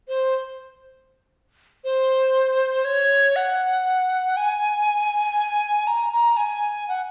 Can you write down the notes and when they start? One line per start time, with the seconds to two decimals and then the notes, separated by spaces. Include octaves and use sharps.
0.08 C5
1.84 C5
2.85 C#5
3.36 F#5
4.37 G#5
5.87 A#5
6.13 A#5
6.37 G#5
6.88 F#5